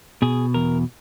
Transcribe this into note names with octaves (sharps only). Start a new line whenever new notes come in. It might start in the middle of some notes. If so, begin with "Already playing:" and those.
B2 G#4
E2 A#4